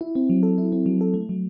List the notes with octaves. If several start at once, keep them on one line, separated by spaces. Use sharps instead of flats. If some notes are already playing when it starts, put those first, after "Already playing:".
E4
C4
F#3
A4
E4
C4
F#3
A4
A3
F#3